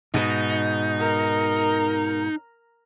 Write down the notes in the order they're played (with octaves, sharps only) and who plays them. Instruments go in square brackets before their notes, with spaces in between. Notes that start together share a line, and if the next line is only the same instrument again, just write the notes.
[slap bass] G#2 B2 [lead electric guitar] D#4
[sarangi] A#4